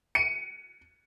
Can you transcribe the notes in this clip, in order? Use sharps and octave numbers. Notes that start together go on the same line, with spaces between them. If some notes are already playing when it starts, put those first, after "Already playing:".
C#7 D#7